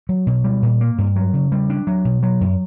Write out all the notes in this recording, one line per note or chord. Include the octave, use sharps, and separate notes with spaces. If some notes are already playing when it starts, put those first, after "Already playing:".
F#3
B2
G3
A#2
A#3
G2
F#3
C#3
G3
D4
F#3
B2
F#3
F#2